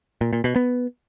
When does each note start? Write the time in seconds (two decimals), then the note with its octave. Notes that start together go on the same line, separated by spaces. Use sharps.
0.21 A#2
0.33 A#2
0.44 B2
0.56 B3